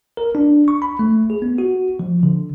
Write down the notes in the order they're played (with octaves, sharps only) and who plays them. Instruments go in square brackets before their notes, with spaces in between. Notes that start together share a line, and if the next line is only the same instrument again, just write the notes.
[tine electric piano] A#4
D4
C#6
B5
A3
G#4
B3
F#4
F3
D3